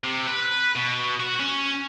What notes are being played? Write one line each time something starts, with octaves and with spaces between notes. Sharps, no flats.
C3
B4
B2
F#4
C#4